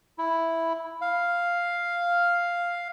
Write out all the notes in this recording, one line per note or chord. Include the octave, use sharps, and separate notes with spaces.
E4
F5